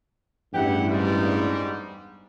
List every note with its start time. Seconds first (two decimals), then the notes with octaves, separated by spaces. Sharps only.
0.53 A1 E2 G2 E4 G4 F#5
0.89 G#2 G3